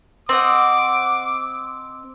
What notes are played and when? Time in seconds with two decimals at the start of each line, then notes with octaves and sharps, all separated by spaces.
0.29 C4 D#5 F#5 D6